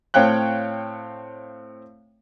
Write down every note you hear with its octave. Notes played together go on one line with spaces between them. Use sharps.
A2 C4 C#5 F5 G5 F#6